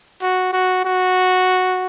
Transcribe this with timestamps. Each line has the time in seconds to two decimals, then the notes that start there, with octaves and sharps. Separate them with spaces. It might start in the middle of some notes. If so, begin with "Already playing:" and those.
0.22 F#4
0.53 F#4
0.85 F#4